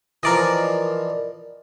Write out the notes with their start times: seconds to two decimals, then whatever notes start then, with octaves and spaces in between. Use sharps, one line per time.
0.23 E3 F3 A#4 D5 D#5